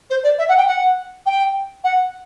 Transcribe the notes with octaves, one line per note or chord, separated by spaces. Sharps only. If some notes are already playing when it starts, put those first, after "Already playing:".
C5
D5
E5
F#5
G5
F#5
G5
F#5